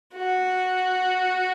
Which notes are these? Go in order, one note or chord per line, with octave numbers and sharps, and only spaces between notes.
F#4